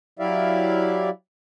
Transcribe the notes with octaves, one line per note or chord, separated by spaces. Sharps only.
F#3 E4 G4 D5 E5 F5